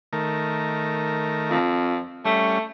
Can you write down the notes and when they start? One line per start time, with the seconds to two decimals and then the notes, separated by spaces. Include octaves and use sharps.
0.13 D#3 A3 A#4
1.50 F2
2.25 G3 A3 C#4